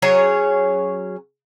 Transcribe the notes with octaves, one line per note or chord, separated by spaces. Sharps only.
F#3 C#4 G#4 C#5